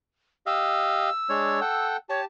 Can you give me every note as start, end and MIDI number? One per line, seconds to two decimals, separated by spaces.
0.46 1.10 67
0.46 1.10 75
0.46 1.10 77
0.46 1.86 88
1.29 1.60 56
1.29 1.60 62
1.29 1.60 73
1.61 1.97 69
1.61 1.97 78
1.61 1.97 79
2.09 2.25 67
2.09 2.21 73
2.09 2.25 81